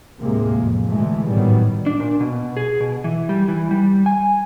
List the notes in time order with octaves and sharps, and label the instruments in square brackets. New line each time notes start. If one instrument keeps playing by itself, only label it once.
[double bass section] D#2 A2 C3 G#3 A#3
A1 F2
B2 D3 E3 G#3 A3
G#1 A2 D#3 F#3 G3 B3
[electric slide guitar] D4
A#2
B2
G#4
B2
E3
G3
E3
G3
G#5